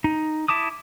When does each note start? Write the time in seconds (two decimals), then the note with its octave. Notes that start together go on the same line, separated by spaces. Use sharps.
0.04 D#4
0.48 E4 A5 D6 D#6